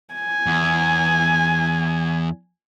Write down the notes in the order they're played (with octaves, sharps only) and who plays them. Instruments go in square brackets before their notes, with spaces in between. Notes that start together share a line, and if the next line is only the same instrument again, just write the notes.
[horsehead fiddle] G#5
[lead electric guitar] E2